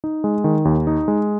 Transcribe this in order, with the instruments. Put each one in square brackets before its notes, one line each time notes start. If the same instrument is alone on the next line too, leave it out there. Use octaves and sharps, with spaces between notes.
[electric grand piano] D#4
G#3
D#3
D#2
D#4
G#3